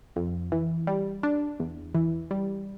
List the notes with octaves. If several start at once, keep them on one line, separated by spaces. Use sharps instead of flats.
F2
E3
G3
D4
E2
E3
G3